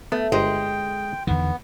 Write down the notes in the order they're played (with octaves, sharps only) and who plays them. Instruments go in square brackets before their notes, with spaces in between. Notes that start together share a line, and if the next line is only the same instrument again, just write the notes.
[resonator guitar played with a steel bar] A3 [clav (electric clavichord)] B3
[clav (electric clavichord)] G1 C5 D#5 [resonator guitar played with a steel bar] G#3 [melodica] G5
[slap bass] E2 D3 D#3 [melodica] B3